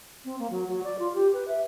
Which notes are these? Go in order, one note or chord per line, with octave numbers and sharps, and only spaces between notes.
C4
A#3
F#3
F#3
D5
F4
G4
B4
E5